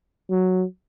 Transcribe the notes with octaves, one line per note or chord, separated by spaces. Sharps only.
F#3